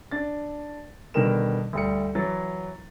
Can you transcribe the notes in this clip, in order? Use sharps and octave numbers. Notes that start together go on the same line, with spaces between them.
D4 A6
B2 D3 D#3 G3 A#4 E7
D2 G3 C#7
E3 F#3 A6